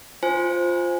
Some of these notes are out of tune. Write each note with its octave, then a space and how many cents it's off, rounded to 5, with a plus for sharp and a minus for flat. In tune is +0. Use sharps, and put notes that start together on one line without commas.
F4 +5 C5 +0 G#5 +0